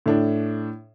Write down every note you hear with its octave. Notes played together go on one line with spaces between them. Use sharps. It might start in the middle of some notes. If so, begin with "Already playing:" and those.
A2 D4